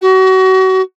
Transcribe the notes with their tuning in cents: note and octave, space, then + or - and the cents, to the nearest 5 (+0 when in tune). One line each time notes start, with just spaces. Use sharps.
F#4 +30